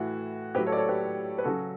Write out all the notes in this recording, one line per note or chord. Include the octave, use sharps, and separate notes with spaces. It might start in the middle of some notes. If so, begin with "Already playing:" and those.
Already playing: A2 E3 F#4
A2 F#3 G4 B4
A4 C#5
D5
A4 C#5
G4 B4
B4
C#3 F#3 F#4 A4